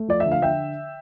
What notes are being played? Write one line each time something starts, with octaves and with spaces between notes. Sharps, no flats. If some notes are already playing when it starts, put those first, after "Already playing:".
Already playing: A3
F3 D5
E5
D3
F5
D3 E5 G5